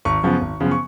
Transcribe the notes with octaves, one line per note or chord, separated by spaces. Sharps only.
G#1 C#6
F#2 C#3 F3 B3
G#1
F#2 C#3 F3 B3
C#6